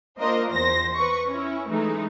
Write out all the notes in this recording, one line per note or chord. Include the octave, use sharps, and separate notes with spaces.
A#3 D4 F4 A#4 C5 D#5
E2 C5 A#6
B4 C#6
C#4 E4
E3 G#3 A3 D#4